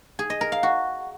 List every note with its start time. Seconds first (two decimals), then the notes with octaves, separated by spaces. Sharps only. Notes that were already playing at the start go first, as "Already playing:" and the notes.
0.19 G#4
0.30 D#5
0.41 A#4
0.52 F5
0.63 F#4